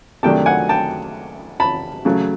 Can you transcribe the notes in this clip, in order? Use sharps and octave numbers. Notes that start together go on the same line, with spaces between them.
C3 D#3 F#3 A3 D4 G5 A5
F#5 G#5
G5 A5
A5 B5
C#3 F#3 A3